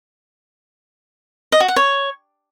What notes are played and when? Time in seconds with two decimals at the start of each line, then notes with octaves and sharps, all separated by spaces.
1.52 D#5
1.60 F#4
1.68 F#5
1.76 C#5